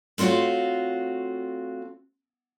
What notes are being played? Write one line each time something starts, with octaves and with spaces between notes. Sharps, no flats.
A3 C4 F4 F#4 C#5